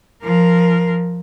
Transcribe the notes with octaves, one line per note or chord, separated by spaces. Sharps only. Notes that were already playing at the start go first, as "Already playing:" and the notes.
F3 A#4